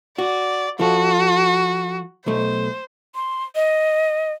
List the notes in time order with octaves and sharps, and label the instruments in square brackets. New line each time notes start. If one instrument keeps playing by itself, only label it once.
[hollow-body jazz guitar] F#4 [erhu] D5
[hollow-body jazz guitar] F3 A4 [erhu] F#4
[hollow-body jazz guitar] B1 A3 [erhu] C5
[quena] C6
D#5